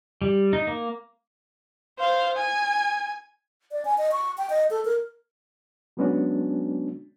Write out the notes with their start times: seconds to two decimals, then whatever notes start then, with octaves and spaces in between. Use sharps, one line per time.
0.22 G3
0.53 D#4
0.67 A#3
1.99 C5 F5
2.38 G#5
3.71 D5
3.85 G#5
3.98 D#5
4.12 C#6
4.38 G5
4.50 D#5
4.71 A4
4.85 A#4
5.97 F#3 G#3 B3 C#4 D4 F#4